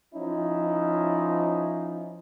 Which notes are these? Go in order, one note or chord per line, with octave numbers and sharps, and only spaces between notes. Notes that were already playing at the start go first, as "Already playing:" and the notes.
F3 C#4 D#4 E4